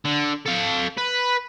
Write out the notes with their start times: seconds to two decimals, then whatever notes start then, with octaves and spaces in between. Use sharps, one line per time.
0.05 D3
0.46 A4 F5
0.97 B4